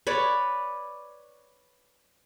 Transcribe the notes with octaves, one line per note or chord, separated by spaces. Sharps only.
B4 C#5 D5